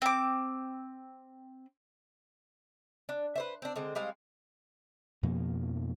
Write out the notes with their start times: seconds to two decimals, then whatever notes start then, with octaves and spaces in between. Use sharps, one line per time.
0.02 C4 D6
3.09 D4
3.36 B4 C5 E5
3.62 C4 D4
3.76 D3 G#3 C4
3.95 G3 G#3 C4 F5
5.23 F2 B2 F3 A#3